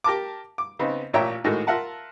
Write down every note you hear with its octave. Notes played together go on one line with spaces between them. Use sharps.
G4 A#4 A5 D6
D6
C#3 B3 C4 D#4
A1 A#2 C#5 E5 G5 A#5
A2 D#3 G#3 A#3 F#4 A4
F4 A#4 E5 F#5 A5